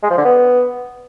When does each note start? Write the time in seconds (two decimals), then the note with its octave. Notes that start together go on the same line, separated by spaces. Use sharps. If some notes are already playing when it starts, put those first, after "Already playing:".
0.03 G#3
0.10 F3
0.18 D3
0.25 B3